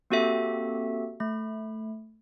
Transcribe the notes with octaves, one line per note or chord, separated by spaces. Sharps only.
A#3 C4 F#4 G4 A4 E5
A3 B5